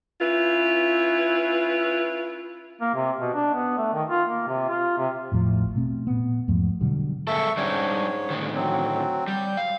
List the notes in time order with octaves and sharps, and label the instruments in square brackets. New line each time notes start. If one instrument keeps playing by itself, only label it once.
[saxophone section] C#4 E4 F4 B4
[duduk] A#3
C3
B2
D4
B3
A3
D#3
F4
A#3
C3
F4
C3
[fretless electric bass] A1 E2 A2 F3
B2 A3 C4
A#2 B3
E2 G#2 F3 A3
B2 D3 F#3 G3
[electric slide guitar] G#3 A#3 A4 [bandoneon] E5 C#6
[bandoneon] G#2 C#5 [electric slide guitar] G3 C#4 D4
[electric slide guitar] A2 D3 D#3
[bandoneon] F#3 C4
[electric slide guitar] G3 [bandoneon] G6
[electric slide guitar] F5